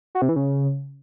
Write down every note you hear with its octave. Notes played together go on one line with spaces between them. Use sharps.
F#4
C3
E3
C#3